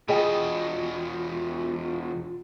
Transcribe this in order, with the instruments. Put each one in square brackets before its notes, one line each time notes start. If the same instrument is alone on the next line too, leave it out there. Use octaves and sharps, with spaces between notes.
[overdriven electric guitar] E2 B2 [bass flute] F4 [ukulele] G#4 D#5 G5